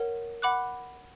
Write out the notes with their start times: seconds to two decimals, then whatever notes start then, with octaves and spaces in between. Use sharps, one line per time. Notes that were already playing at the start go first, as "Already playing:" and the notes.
Already playing: A#4 C#5 F#5
0.42 F#5 B5 D6 F#6